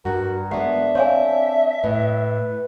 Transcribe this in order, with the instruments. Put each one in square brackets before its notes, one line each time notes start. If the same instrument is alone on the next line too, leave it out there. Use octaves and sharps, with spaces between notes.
[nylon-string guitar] G2 [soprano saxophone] F#4 [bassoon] A#4
[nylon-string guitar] G#3 B3 [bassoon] D4 [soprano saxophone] E5 [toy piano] F#5
[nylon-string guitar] C4 [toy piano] C#5 F5 G#5
[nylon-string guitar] A2 [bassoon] B4